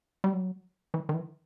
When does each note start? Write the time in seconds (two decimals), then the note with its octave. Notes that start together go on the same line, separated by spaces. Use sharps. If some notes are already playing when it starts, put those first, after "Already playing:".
0.24 G3
0.33 F#3
0.94 E3
1.09 D#3
1.14 E3